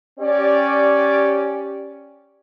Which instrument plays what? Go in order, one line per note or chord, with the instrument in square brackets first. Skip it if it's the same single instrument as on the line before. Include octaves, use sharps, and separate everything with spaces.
[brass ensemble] C#4 G4 D5